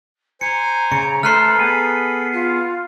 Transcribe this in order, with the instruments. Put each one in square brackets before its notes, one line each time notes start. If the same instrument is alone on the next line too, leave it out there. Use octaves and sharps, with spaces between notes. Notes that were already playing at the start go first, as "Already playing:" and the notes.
[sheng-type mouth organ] C5 G#5 [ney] A#5 [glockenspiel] C#7
[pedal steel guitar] C#3 [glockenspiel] C#7
[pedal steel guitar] A3 B4 C5 [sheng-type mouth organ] A4 [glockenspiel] F6 F#6 C7
[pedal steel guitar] B3 G#4 B4
[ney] F4